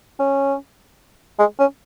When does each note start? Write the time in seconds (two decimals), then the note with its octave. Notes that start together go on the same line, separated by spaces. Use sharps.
0.20 C#4
1.39 G#3
1.60 C#4